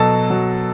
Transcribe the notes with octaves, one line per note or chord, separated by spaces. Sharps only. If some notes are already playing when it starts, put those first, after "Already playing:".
Already playing: B2 F#3 A4 A5
F#3